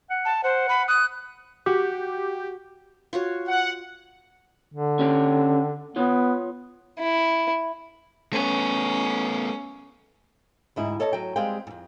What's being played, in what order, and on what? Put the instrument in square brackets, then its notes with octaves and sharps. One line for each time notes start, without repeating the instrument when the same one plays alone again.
[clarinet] F#5
[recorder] A5
[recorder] C5 [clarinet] F#5
[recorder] B5
[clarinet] D#6 [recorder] F#6
[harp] F#4 [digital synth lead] G4
[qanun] F4 F#4 C#5
[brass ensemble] F#5
[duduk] D3
[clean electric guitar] C#4 G4 G5
[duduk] B3 [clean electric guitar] F4 C#5
[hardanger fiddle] E4
[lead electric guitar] A3 B3 [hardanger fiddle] C#4
[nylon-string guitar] D2 G#2 E4 D#5
A4 C#5 D#5 A5
F#3 G5
G3 G#3 C4 G#4 F5 G5
F2 G#2